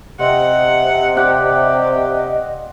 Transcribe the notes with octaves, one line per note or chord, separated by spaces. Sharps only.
C3 C4 D#5 F#5
G4 D5 F5 F#5